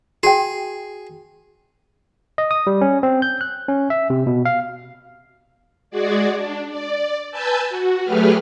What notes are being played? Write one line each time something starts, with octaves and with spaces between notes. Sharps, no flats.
F#4 G#4 G5
D#5
D#6
G3
C#4
C4
G6
F#6
C#4
E5
C3
B2
F5
G#3 F#4 G#4 D5
D4
D5
B4 G#5 A5 E6 G6 A6
F#4
F#3 A3 G4 G#4 B4 F6